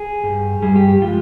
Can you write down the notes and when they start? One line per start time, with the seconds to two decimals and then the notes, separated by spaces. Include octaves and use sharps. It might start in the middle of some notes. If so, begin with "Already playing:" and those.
Already playing: G#4
0.24 G2 G3
0.62 G2 G3 G#4
0.76 G4
0.88 G4
1.02 F3 G#3 F4